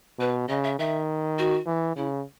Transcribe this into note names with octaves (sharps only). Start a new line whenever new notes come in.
B2 B4
C#3 D#5
E5
D#3 E5
F#4
E3
C#3 E4